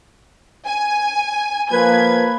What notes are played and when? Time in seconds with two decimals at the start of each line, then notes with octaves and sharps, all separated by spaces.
0.66 G#5
1.71 F3 A#3 B4 G#6